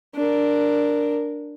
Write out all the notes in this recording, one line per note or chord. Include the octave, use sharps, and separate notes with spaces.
D4 A#4